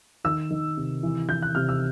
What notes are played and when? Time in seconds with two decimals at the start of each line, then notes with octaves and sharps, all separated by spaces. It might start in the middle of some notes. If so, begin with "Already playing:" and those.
0.24 D#3 E6
0.50 D#3
0.77 C3
1.03 E3
1.29 E3 G6
1.42 F#6
1.55 C3 F6
1.69 E6